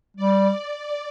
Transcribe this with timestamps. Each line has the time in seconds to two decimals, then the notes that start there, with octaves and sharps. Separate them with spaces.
0.17 G3 D5